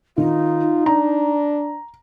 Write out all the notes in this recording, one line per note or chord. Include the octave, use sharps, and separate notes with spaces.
D#3 D#4 F4
D4 A#5